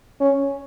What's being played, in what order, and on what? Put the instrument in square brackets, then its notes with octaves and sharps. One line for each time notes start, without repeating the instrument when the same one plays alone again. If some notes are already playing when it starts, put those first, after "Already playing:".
[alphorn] C#4